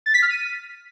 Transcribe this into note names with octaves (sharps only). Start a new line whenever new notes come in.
A6
B6
F6
D#7